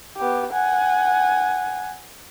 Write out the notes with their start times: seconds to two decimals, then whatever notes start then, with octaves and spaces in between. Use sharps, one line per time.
0.17 B3 G4
0.53 F#5 G#5